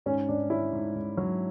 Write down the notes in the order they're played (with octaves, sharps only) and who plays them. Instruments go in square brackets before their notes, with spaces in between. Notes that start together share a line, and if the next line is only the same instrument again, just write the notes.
[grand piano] G#2 [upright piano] C#4
[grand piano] G#2 [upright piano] D4
[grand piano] C#4 [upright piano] E4
[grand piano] G#2
G#2
F#3